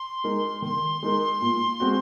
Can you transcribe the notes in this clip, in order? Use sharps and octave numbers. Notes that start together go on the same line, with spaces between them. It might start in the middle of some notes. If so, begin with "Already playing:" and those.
Already playing: C6
G#3 D#4 A#4
D#3 C6
G#3 D#4 A#4
A#2
G#3 C4 F#4